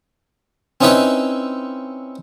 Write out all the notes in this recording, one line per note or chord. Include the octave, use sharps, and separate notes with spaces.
C4 C#4 D#4 E4 B4 C#5